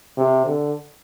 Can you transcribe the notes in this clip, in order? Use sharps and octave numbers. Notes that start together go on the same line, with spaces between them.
C3
D3